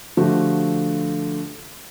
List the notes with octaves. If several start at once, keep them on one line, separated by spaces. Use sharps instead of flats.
D3 F3 A3 F#4 G4